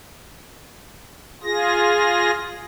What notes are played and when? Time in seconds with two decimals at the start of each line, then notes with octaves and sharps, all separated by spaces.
1.43 F4 G#4 A#6